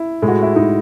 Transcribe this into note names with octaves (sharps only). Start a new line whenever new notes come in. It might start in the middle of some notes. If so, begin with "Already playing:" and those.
Already playing: E4
A2 G#3
F#4
E4
A2 G#3 D#4